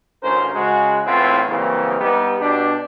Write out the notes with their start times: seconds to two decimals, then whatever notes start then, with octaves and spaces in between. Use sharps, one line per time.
0.23 A1 D2 A3 C#4 A#4 C5
0.54 C#3 G#3 F#4
1.06 E2 A2 B3 C4 E4 F4
1.49 C#3 E3 F#3 G3 A#3 C4
2.00 G3 B3 D#4 G4
2.40 B2 D4 G4